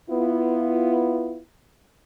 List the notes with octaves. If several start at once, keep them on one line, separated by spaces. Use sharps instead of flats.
B3 E4 F4